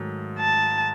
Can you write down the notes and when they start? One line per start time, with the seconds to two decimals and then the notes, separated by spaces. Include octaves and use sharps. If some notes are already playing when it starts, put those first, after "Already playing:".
Already playing: G#2 D#3 F#3 A3
0.40 A5